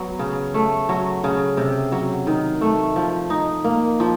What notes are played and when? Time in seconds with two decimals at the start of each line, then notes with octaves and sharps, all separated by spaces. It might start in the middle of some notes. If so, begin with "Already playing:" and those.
Already playing: F#3 B3
0.19 C#3
0.54 A3
0.89 F#3
1.24 C#3
1.57 C3
1.92 F#3
2.27 D#3
2.61 A3
2.96 F3
3.30 D#4
3.64 A#3
4.00 F3